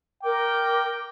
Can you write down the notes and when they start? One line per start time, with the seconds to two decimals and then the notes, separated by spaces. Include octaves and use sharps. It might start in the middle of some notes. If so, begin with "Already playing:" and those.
0.23 A#4 G5 D6